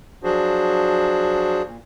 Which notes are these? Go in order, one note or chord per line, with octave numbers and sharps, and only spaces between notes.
F3 F#3 D4 F#4 G#4 C5
A#2